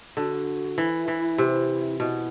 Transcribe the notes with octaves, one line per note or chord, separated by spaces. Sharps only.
D3 F#4
E3 E4
E3
C3
B2 E4